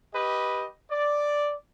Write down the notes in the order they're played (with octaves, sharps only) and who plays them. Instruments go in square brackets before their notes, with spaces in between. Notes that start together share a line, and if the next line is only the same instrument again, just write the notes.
[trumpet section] G4 B4 D#5
D5